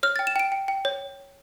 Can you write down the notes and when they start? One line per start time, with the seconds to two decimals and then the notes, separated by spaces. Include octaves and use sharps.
0.03 C#5 F6
0.16 G5 A6
0.27 E7
0.36 G5 D7
0.52 G5
0.68 G5
0.85 C#5